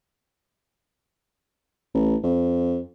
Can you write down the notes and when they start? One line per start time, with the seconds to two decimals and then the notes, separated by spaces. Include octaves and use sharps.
1.94 A1
2.23 F2